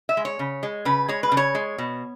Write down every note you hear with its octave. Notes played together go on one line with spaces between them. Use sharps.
E5
G#3
C#5
C#3
G#3
C#3 B4
G#3 C#5
B4
C#3
C#5
G#3
B2